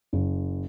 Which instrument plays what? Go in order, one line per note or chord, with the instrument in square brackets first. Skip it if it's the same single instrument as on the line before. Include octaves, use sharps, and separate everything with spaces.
[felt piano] F#1